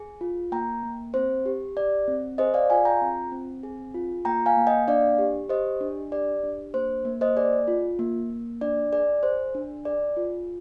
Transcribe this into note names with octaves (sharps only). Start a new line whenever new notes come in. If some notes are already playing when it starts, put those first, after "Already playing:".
Already playing: G#4
F4
A#3 G5 A#5
A#3
C4 C5
G4
G4 D5
C4
G#4 C5 D#5
D5 F5
F4 F5 G#5
G5 A#5
C4
C4
G#4
F4
A#3 G5 A#5
F5 G#5
A#3
D#5 G5
D4 D5 F5
G4
G4 C5 D#5
D4
G4 D5
D4
A#3 C5
A#3
C5 D#5
G#4 D5
F4
A#3
A#3
D4 D5
G#4 D5
G#4 C5
D4
G#4 D5
F4